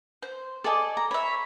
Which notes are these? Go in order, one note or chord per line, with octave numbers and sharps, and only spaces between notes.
C5
A4 D5 D#5 G#5
A#5
C#5 E5 B5